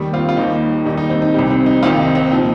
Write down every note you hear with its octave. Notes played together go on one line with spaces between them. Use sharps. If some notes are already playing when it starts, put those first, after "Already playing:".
Already playing: D#2 D#3 G3
C4 F4
F4
D#2 D#3 G3 D#4
D#2 D#3 G3 D#4
D#4
C4
D#4
C2 C3 G3
C4
D#4
C2 C3 D#3 G3 C4 F4
D#4
C4
A#2 F3 D#4